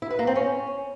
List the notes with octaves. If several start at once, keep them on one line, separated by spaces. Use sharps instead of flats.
E4
B4
A#3
C4
C#4